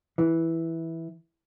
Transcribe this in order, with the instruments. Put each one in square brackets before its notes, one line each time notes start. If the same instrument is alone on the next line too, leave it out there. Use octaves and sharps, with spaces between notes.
[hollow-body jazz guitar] E3